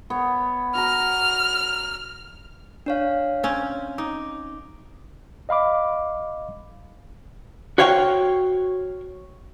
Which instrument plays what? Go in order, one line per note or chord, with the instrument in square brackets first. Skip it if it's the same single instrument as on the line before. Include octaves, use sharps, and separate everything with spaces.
[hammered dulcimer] B3 C#5
[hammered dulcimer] F#4 A#5 [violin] F6
[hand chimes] D4 C#5 F5
[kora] C4 C#4
[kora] D#4 [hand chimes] D6
[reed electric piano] D#5 F5 B5 D6
[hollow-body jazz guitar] F#4 C5 C#5 F5 G5